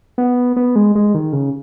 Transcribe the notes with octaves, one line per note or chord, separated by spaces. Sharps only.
B3
B3
G#3
G#3
D#3
C#3